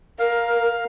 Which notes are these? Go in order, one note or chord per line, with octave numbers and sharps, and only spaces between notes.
A#4 F5